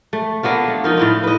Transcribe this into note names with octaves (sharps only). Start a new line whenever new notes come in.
A3
A#3 B3 D4 F4
A3
F3 D#4 A#4
A2 E4 F4
B4 D#5